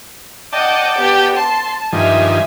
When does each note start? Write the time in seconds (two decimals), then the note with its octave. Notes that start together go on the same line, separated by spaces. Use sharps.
0.53 D5 D#5 F#5 G5 A5
0.98 B3 G4
1.36 A5 C6
1.93 G2 D#3 F3 E5 G#5